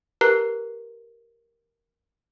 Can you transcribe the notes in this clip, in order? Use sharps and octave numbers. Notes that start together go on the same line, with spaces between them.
G4 A#4 B4 A#5 F#6 C7